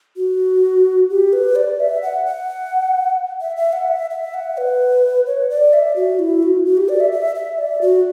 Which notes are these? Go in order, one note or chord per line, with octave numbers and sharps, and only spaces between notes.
F#4
G4
B4
D5
E5
F#5
F#5
E5
E5
F#5
E5
E5
F#5
B4
C#5
D5
E5
F#4
E4
F#4
F#4
G4
D5
E5
E5
E5
D5
F#4